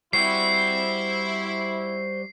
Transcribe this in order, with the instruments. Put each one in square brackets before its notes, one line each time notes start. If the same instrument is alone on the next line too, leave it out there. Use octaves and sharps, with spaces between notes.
[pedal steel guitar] G3 F#4 [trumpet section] E4 [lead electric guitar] C5 G5 [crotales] C7